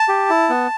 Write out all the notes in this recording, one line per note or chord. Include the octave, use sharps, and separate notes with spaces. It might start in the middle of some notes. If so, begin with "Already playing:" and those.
Already playing: A5
G4
E4
B3